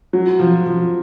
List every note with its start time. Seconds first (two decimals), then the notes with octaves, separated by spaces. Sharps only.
0.13 F#3
0.39 F3
0.66 F3